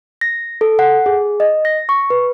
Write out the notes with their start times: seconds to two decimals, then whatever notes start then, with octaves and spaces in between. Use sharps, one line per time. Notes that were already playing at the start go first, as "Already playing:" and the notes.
0.21 A#6
0.61 A4
0.79 F#5
1.06 G#4
1.40 D#5
1.65 A#6
1.89 C#6
2.10 B4